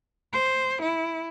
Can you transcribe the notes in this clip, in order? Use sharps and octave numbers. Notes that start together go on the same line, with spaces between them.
C5
E4